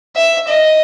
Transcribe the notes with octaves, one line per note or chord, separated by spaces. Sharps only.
E5
D#5